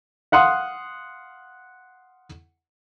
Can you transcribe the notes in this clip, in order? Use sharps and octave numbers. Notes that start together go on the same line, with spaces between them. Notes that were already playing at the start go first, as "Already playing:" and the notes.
F5 F#5 C6 D#6